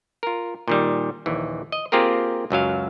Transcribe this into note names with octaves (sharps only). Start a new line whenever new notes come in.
F4 A#4
A#2 D#3 G3
A#1 D#2 E3
D#5
A#3 C4 F4 G4 G#4 A#4
C#2 F#2 F#3 F5